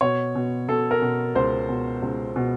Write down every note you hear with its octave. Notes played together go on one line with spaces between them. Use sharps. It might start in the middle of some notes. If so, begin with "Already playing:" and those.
B2 C#5
B2
B2 A4
A#4
B2
C#2 C5
B2
C#2
B2